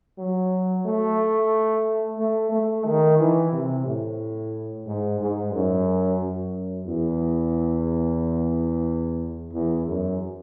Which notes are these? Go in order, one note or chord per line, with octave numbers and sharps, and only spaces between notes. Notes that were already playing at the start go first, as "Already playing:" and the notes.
F#3
A3
A3
A3
D#3
E3
C3
A2
G#2
G#2
F#2
F#2
E2
E2
F#2